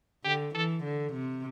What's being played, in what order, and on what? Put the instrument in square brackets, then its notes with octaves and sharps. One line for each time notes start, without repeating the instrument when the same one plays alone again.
[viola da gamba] D3 [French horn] G4
[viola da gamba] E3 [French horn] A4
[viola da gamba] D3
C3